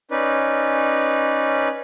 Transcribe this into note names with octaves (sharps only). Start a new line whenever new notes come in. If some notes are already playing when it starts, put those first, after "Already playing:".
C#4 D#4 B4 D5